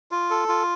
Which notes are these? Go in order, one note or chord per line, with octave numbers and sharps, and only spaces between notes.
F4
A4
F4